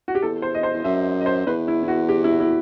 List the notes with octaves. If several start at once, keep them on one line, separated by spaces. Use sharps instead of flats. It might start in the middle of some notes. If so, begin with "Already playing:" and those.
F#4
G4
E2 A4
C5
D#5
C5
E2
F#2 E5
D#5
C5
E2 B4
E4
E4
F#4
G4
E4
E4